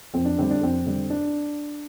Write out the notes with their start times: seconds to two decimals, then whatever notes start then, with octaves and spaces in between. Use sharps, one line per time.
0.14 F2 C4
0.25 D4
0.38 D3 G3 C4
0.51 D4
0.61 F2 C4
0.86 D3 G3
1.10 D4